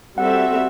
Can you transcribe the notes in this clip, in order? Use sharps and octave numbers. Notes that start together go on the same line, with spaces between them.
G3 C4 F#4 A4 E5 F#5